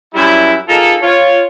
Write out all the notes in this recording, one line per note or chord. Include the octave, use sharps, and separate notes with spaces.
F#2 G3 E4
A#3 D#4 F4 G#4 A4
F4 C#5